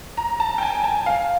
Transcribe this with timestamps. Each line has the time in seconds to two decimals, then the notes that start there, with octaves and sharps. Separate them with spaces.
0.17 A#5
0.40 A5
0.58 G5
0.63 G#5
0.84 A5
1.06 F5